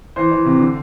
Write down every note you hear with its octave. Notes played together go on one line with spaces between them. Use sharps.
E3 C5
E3
C3
D3